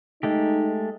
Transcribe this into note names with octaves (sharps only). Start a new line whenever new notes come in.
G#3 A3 D#4 G4